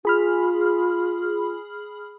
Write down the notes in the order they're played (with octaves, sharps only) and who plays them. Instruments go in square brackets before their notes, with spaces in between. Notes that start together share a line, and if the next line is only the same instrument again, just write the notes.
[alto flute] F4 [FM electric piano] G#4 B5 F6